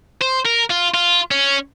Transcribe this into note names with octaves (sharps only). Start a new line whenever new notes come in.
C5
A#4
F4
F4
C#4